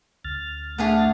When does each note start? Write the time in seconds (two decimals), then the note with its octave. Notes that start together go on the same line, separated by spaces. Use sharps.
0.24 D2 F6 A6
0.78 A3 B3 D4 G#4